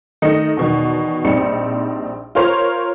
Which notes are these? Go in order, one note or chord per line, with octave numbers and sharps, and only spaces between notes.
D#3 A3 D#4 D#5 C#7
E2 B2 D#3
A#1 G3 C4 D#4 C#7
F4 A#4 C5 C#5 C6